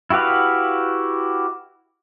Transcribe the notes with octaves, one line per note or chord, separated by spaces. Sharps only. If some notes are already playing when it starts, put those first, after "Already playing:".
E4 F#4 G4 B4 F5